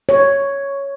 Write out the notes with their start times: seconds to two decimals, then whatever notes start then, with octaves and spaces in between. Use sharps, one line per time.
0.09 C#5